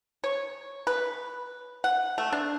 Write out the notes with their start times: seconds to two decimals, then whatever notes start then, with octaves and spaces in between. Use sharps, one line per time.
0.24 C#5
0.87 B4
1.84 F#5
2.18 A3
2.32 D4